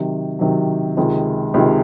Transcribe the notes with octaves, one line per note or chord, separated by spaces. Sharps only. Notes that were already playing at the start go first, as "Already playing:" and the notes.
Already playing: C3 D#3 F#3
C3 D#3 F#3
C#2 C3 D#3 G#3
C#2 C3 D#3 G#3